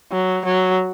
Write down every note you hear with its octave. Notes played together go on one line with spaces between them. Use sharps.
F#3
F#3